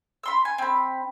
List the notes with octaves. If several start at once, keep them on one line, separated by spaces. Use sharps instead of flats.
B5 C6 E6
G#5
C4 B5